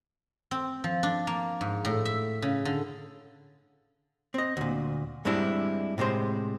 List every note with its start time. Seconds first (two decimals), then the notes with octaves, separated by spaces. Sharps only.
0.51 C4
0.84 F3
1.03 D4
1.27 A#3
1.61 G#2
1.85 A2
2.05 E5
2.42 C#3
2.65 D3
4.34 C4 D#5
4.57 D2 A#2
5.25 G2 G3 G#3 C4 D4 E4
5.98 A2 C3 G#3 C5